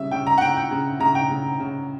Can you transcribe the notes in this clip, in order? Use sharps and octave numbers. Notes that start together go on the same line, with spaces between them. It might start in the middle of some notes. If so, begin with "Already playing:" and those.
Already playing: C#3 G3 E5
C#3 G5
A#5
F#5
C#3 G5
G5
C#3
C#3 A#5
G5
C#3
C#3